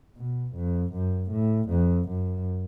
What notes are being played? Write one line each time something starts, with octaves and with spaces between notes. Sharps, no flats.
B2
F2
F#2
A2
F2
F#2